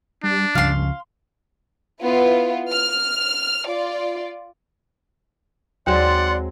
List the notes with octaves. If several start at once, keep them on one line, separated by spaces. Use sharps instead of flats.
G3 D4
C#2 G2 C#3 F3 F5 C6
B3 E4 F4 B4
F6
F4 D5
D#2 F#3 G#3 C4 D5 F#5 C6